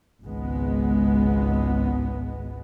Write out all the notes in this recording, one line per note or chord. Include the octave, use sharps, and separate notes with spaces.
G#1 C#2 G#3 B3